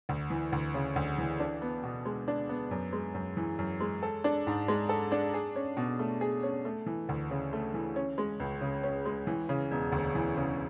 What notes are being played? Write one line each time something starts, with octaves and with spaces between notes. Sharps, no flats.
D2
E3
D2
C#3
D2
E3
D4
B3
B2
G#3
D4
B3
F#2
G#3
F#2
E3
F#2
G#3
A4
D4
G#2
G#3
A4
D4
G#4
C#4
B2
A3
G#4
C#4
A3
E3
D2
C#3
A3
E3
C#4
G#3
C#2
C#3
C#4
G#3
E3
C#3
E1
D2
E3
C#3